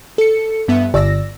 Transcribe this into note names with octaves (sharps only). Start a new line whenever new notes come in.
A4 C#7
G2 B3 E5
G1 D5 E6 A#6